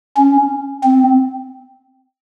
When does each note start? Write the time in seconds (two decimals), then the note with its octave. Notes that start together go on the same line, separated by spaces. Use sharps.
0.17 C#4
0.84 C4